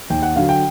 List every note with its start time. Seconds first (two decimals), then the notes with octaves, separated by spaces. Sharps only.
0.10 D#2 G5
0.22 F#5
0.36 D3 F#3 F5
0.49 G5